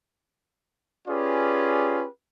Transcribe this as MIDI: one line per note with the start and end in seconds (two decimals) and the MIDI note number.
1.08 2.06 61
1.08 2.06 65
1.08 2.06 67
1.08 2.06 68
1.08 2.06 71
1.08 2.06 74